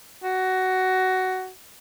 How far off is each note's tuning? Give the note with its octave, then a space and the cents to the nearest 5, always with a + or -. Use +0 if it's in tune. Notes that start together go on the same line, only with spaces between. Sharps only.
F#4 +15